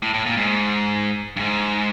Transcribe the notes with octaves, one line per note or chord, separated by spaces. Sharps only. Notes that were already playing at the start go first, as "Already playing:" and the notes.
A2
A2
A#2
G#2
G2
G#2